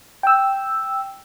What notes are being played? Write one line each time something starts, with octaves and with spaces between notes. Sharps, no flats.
G5 E6